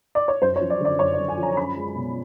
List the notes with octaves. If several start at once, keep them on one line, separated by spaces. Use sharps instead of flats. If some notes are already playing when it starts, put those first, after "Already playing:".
D5
C#5
F#2 C5
C#5
F3
D5
D3 D5
F#2 C#5
D5
F#2
G#5
F3
A#5
C#4 B5
G#3
B2